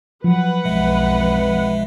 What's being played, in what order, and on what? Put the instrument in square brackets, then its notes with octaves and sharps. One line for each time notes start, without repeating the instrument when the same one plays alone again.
[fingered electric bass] F3 F#3 [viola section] B4 F#5
[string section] B1 F2 [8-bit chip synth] B2 G#3 E5